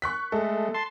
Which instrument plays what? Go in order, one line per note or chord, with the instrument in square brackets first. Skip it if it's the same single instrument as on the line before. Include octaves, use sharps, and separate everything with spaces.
[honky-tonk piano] C#6 F#6 B6
[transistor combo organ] G#3 A3 [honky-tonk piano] A4
[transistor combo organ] A5 C6